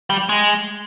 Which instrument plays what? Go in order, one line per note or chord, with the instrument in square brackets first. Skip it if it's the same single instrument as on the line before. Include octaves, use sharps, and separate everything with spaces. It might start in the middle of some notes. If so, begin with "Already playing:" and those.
[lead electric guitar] G3
G#3